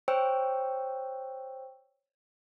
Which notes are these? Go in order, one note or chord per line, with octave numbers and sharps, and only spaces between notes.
C5 C#5 G5 E6